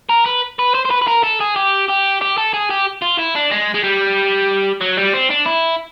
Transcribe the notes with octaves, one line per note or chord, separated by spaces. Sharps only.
A#4
B4
B4
C5
C5
B4
B4
A#4
A4
G#4
G4
G4
G4
A4
G#4
G4
F4
E4
D4
G#3
G#3
G3
F#3
G3
C4
D4
E4